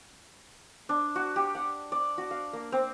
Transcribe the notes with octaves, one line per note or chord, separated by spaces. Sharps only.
D4
F#4
G4
F#5
D5
F#4
F5
A#3
C4